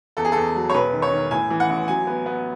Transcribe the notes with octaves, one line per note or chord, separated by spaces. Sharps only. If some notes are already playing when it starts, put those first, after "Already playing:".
E2 A4
G#4
E2 A4
F#3
C#5
E1 B4
D#3
C#5
D#3
A2 G#5
E3
F#5
A1
F#3 G#5
B3
B3